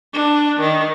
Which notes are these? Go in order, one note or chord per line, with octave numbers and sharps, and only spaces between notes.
D4
D#3